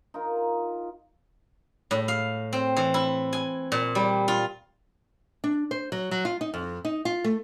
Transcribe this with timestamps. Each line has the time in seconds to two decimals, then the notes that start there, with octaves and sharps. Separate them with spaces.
0.14 D#4 F4 A#4
1.91 A2
2.08 F5
2.53 C4
2.77 E3
2.94 E4
3.33 G#5
3.72 A#2
3.95 G3
4.28 F4
5.44 D4
5.71 C5
5.92 F#3
6.11 F#3
6.25 F4
6.41 D#4
6.54 F2
6.85 D#4
7.05 F4
7.24 A3